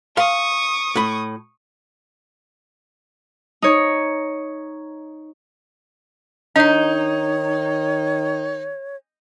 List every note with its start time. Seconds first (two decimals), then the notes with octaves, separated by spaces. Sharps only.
0.17 F5 C6 C#6 D#6
0.96 A2 B5
3.62 D#4 C#5
6.56 D#3 D4 D#4 C#5 D#5